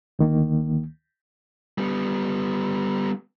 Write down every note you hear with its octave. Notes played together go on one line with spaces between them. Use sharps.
D2 D#3 A#3
G3 B3